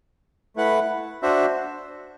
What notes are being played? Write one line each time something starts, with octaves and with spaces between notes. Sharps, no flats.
A3 E4 B4 F#5
D4 F#4 C5 E5